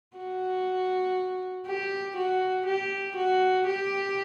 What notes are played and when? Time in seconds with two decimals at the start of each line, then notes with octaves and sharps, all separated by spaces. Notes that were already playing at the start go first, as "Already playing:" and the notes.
0.17 F#4
1.67 G4
2.16 F#4
2.66 G4
3.16 F#4
3.67 G4